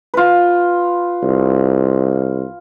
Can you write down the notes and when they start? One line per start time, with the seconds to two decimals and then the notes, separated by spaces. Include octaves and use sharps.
0.14 F4 B4
1.23 C2